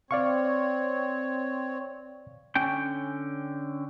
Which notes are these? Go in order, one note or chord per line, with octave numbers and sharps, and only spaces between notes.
C4 C#5 D5 F5 C#6
D3 C#4 G5